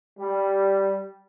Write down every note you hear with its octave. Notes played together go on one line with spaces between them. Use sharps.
G3